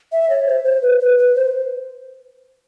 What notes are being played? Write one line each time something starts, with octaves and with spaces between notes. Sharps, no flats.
E5
C#5
C5
C5
B4
B4
B4
C5